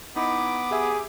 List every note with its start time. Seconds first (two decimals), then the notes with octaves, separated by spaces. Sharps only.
0.16 B3 D#4 E4 D#5 D6
0.71 G4 G#4 E5